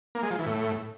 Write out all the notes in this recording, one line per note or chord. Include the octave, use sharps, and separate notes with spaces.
A#3
G#3
F3
E3
A2